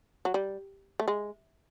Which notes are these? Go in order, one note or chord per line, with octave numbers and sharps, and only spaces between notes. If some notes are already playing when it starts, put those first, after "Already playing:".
F#3
G3
A3
G#3